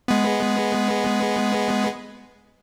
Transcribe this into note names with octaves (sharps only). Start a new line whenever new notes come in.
G#3 B3